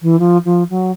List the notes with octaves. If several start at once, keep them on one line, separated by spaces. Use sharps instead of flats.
E3
F3
F3
F#3